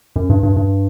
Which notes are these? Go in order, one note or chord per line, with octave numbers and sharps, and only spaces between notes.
F#2
G2
G2
G2